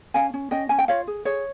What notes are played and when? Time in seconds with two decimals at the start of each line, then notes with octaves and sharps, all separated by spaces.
0.14 C#4 F5 G#5
0.34 C#4
0.51 C#4 D#5 G5
0.69 C#4 G#5
0.78 G5
0.88 F4 C#5 F5
1.07 G#4
1.25 G#4 C#5